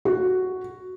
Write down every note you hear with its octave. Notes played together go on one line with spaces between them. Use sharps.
F#4